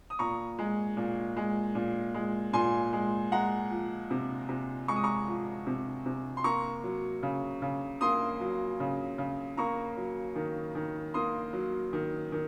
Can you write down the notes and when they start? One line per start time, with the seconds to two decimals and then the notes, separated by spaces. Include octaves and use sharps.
0.10 D#6
0.19 A#2 A#5 C#6
0.59 G#3
0.97 A#2
1.37 G#3
1.75 A#2
2.14 G#3
2.53 A#2 G#5 C6
2.93 G#3
3.32 G#3 F#5 A#5
3.70 F3
4.10 C3
4.49 C3
4.88 G#3 C#6
4.96 D#6
5.03 A#5 C#6
5.28 F3
5.67 C3
6.06 C3
6.37 C6
6.44 A#3 A#5 C#6
6.83 F#3
7.23 C#3
7.62 C#3
8.01 A#3 C6 D#6
8.40 F#3
8.80 C#3
9.18 C#3
9.57 A#3 A#5 C#6
9.97 F#3
10.36 D#3
10.75 D#3
11.14 A#3 C6 D#6
11.53 F#3
11.93 D#3
12.32 D#3